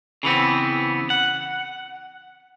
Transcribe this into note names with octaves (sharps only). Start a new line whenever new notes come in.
C#3 E3 B3 C4
F#5